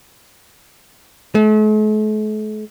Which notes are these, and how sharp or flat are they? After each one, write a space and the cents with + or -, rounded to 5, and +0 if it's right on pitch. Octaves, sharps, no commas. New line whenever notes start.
A3 -45